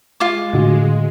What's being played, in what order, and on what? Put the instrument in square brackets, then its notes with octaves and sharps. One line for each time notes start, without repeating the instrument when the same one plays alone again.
[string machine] G#3 [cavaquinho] F4 D6
[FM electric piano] A2 D3 F#4